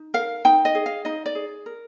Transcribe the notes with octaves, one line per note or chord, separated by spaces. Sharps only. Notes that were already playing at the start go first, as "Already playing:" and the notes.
Already playing: D#4
A#4 F5
D#4 G5
D#5
G#4
F5
D#4 D#5
D5
G#4
A#4